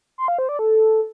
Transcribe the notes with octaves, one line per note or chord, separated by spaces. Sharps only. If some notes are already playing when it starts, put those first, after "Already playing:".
C6
F5
C5
D5
A4